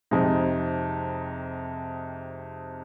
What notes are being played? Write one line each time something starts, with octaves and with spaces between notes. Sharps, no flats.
F2 C3 G#3 D#4